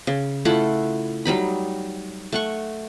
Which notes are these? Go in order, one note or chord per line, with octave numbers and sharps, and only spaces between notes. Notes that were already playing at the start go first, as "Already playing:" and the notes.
C#3
A3 E4 F4 F#5
F#3 G3 D#4 B5
A3 F#5 C#6